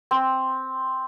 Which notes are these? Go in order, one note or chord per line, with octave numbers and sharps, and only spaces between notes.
C4